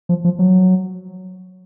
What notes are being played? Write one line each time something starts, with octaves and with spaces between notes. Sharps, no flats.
F3
F3
F#3